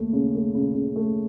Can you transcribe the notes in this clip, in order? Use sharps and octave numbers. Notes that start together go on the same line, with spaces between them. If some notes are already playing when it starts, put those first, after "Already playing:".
Already playing: D#2 A3
C#3
A3
C#3
C#3
A3